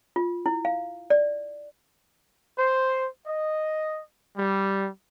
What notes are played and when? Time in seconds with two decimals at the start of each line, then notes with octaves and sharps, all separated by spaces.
0.16 F4
0.46 E4
0.65 F5
1.10 D5
2.57 C5
3.27 D#5
4.36 G3